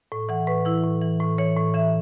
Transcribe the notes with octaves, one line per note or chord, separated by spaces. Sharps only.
A2
E3 F#5
A2 B4
E3 E4
A2
E3
A2
E3 C#5
A2
E3 E5